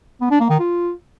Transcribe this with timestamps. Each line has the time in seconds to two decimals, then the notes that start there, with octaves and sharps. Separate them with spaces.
0.21 B3
0.31 D4
0.40 A#3
0.50 D#3
0.59 F4